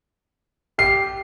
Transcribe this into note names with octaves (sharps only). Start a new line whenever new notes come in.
G4 C7